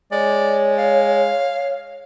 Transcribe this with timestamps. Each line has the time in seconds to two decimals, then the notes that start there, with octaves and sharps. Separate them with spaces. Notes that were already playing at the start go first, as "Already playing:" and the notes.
0.12 G#3 C#5 D5
0.78 F5